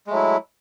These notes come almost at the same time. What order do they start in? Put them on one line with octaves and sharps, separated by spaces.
G#3 A3 F#3 E4